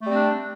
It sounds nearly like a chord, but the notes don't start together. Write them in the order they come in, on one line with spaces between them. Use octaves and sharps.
A3 G3 C4 D4